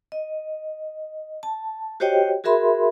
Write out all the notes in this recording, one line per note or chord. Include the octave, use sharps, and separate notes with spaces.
D#5
A5
F#4 G4 C5 C#5 D#5 G5
F#4 G#4 A#4 E5 B5 C6